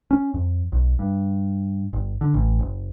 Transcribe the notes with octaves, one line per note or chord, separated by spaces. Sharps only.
C#4
F2
B1
G2
G1
D3
A1
F#1